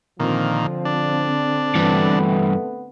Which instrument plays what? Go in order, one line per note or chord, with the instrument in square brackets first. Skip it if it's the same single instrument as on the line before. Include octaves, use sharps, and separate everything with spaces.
[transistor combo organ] A#2 D#3 [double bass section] D3 C4 [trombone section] F3
[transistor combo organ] D4
[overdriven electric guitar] G2 E3 [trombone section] A3 B3